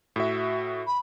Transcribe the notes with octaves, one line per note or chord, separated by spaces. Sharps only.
A2 F#4 E5
B5